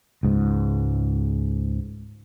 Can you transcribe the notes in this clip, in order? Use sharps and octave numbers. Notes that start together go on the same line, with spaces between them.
C#2 G#2